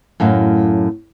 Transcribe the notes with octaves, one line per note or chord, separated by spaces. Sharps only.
F#2 A2 F#3 F5